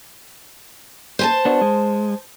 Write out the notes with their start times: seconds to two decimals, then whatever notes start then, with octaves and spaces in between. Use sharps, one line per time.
1.19 C5 G#5 A5
1.45 B3 D4 F#4
1.61 G#3